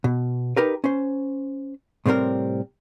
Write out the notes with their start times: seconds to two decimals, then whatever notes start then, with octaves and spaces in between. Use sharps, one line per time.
0.04 B2
0.57 D#4 G4 A#4 B4
0.84 C#4 C5
2.06 A2 C3 G3 C4 A#4